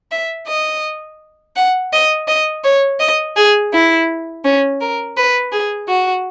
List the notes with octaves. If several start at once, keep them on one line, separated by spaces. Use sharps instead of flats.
E5
D#5
F#5
D#5
D#5
C#5
D#5
G#4
E4
C#4
A#4
B4
G#4
F#4